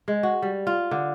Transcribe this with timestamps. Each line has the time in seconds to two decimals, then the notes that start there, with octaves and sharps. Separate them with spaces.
0.08 G#3
0.23 F#4
0.42 G3
0.67 F4
0.91 D3